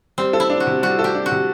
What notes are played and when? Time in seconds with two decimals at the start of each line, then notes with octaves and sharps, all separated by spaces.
0.18 G3 C4
0.33 A4
0.40 E4
0.50 D4
0.60 F#4
0.67 C3
0.82 G3 F#4
0.99 A4
1.04 G4
1.15 D4
1.26 F#4
1.32 C3